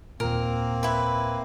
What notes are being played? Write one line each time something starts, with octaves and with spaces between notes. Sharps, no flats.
D#2 A#2 A#3 C4 A#4
E4 B4